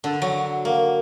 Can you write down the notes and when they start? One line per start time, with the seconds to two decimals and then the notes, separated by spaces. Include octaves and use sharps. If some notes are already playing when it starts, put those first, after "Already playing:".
0.04 D3
0.22 F#3
0.65 A#3